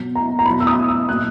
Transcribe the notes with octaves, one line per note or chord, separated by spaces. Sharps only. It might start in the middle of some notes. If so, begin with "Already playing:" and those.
Already playing: B2 F#3
A#5
A#5
B2 F#3 B5
E6
D#6
E6
A#2 F#3 F#6